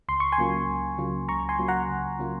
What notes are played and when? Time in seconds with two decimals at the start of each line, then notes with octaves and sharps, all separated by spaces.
0.09 C#2 C6
0.20 C#6
0.32 G#5 C6
0.38 C#3 F#3 A#3 F4
0.69 C#2
0.98 C#3 F#3 A#3 F4
1.29 C#2 A#5 C#6
1.49 G#5 C6
1.59 C#3 F#3 A#3 F4
1.68 F#5 A#5
1.89 C#2
2.19 C#3 F#3 A#3 F4